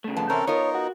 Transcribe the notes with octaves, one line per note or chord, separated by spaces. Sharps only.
C#3 A3
F2 B3 A5
E2 C3 C4 C#4 A4 A#4 C5
B3 D#4 F4 A#4 C#5
F#4